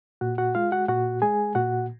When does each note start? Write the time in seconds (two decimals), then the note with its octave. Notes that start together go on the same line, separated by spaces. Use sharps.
0.21 A#2 F#4 F#5
0.38 F#4 F#5
0.55 G#3 F4 F5
0.72 F#4 F#5
0.88 A#2 F#4 F#5
1.22 G#3 G#4 G#5
1.55 A#2 F#4 F#5